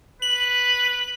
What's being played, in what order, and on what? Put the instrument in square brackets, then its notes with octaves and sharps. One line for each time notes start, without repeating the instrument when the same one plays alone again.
[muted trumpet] B4 [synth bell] F#7